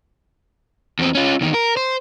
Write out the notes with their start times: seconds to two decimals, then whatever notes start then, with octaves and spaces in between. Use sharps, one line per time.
0.99 E2 C4
1.15 C#4 F4
1.41 E2 D#3
1.54 A#4
1.77 C5